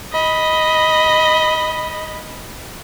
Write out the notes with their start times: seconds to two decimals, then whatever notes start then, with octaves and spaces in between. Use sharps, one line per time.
0.12 D#5 B5